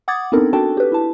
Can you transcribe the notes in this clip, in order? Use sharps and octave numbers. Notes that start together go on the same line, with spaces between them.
F#5 D6 D#6 G#6 A6
B3 C4 D4 D#4 A4 A#4
D4 F#4 A4 G5 A5
G4 B4
E4 A5